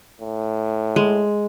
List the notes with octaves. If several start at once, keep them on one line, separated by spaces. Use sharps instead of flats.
A2
G#3